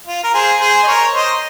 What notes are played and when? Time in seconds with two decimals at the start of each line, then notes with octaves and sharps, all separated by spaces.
0.07 F4
0.23 A#4
0.34 G#4 C5
0.60 G#4 C5
0.83 D#5
0.87 A#4 C#5
1.13 C5 D#5